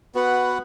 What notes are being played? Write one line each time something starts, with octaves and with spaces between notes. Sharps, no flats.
B3 F#4 B4 F#5